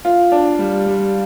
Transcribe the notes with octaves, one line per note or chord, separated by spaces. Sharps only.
F4
D4
G3
G3